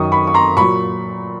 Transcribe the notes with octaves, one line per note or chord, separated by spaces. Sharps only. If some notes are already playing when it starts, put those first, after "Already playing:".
Already playing: F#2 D#3 F#3 C#6 D#6
B5 C#6
C#6
A#5 C6
A#2 F#3 B5 C#6